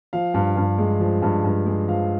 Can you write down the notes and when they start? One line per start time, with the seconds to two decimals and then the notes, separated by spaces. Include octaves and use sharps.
0.13 F3 F5
0.34 G2
0.57 G2
0.78 G#3
1.00 F3
1.22 G2
1.44 G2
1.66 G#3
1.89 F3 F5